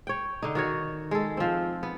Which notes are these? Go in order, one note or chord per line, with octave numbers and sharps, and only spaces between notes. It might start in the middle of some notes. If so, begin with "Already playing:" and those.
C#5 G5
D3 D#4
D#3 F#4 C#5
G#3 A4
F3 C4
B3